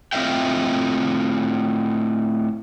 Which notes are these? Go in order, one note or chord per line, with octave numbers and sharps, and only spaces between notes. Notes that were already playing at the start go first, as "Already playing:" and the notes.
A2 C4 F4 D#5 E5 G5